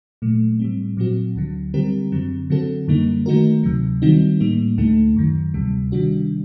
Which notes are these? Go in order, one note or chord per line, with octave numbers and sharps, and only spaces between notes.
A#2 F#3 A3
A2 G3 C4
A#2 F#3 C4 F#4
D2 D3 F#3
D3 G3 C4 G4 A#4
F#2 D3 F#3 C4
D3 F#3 C4 F#4 A4
F#2 D3 G3 A#3 D#4
D#3 A3 D#4 F#4 A#4
D2 C3 F#3
D#3 G3 C4 D#4 F#4
A2 G3 A#3 D#4
D2 D3 A3 D#4
F#2 D#3 F#3
D2 C3 G3
C3 D#3 G3 D4 F#4